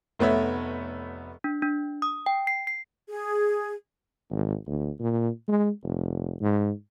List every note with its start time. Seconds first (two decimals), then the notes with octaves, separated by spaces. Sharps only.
0.19 F1 A3 B3 C#5 E5
1.44 D4
1.62 D4
2.02 D#6
2.26 G5
2.47 C7
2.67 C7
3.09 G#4
4.31 G#1
4.67 D2
5.00 A#2
5.48 G#3
5.84 F1
6.41 G#2